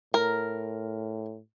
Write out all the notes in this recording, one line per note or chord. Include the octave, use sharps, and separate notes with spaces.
A2 A#4